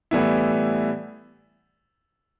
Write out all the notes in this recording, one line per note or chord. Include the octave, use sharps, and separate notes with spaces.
A2 E3 G3 B3 E4